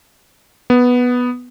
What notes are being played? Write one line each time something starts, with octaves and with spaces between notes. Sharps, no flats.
B3